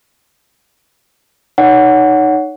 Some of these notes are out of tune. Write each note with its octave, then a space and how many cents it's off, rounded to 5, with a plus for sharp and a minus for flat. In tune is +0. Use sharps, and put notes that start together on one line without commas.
D#4 -10 C#5 +25 F#5 +0